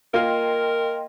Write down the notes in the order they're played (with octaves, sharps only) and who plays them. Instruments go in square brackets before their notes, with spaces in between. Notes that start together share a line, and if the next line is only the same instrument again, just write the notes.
[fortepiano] A#3 F4 [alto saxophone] A#4 [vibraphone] D#5 G5 C6